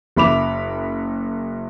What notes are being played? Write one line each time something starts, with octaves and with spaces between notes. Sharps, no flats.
F#1 E5 B5 D6 F7